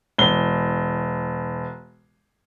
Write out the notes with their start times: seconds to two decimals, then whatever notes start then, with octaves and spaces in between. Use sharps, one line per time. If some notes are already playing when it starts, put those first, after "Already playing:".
0.18 E1 G7